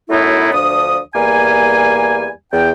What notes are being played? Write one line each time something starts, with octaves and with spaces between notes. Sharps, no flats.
F#2 F#3 A3 B3 D#4 E4
D2 F3 D4 D#6
E2 G3 A#3 G#5
E2 G5